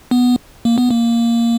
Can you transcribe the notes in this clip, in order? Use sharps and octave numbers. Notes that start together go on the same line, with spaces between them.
B3
A#3
B3
A#3